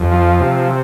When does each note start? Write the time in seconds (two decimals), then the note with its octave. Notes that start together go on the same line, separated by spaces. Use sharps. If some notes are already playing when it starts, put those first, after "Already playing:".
Already playing: F2
0.12 F3
0.40 C3